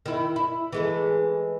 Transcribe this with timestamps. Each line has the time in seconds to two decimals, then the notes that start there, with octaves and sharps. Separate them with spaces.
0.06 D#3 E4
0.36 E4
0.72 E3 G#3 A3